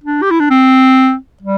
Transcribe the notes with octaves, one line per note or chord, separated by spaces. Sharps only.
D4
G4
E4
D4
C4
G3